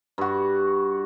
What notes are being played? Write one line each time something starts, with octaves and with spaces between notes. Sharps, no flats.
G2 F#4